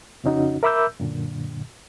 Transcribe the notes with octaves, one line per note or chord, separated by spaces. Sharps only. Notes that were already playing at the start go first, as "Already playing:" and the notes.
F2 C#3 C#4 D#4 F#4
A#4 E5 B5 D6 E6 G6
F#2 A#2 D3